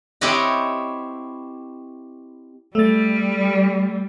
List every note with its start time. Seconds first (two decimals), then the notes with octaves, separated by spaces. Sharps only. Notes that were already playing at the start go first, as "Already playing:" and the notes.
0.21 C4 E4 G4 C#5 D#5 F#5
2.75 G3 A3 A6